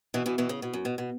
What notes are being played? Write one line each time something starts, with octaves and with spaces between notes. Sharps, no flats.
B2 E3
B2 E3
B2 E3
C#3
B2
F#2
B2
B2